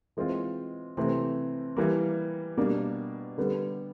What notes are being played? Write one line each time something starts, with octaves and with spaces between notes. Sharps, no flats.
E3 G#3 C4 F4
C3 E3 A3 C4
E3 G3 A#3
B2 G3 A#3 D4
D3 G3 B3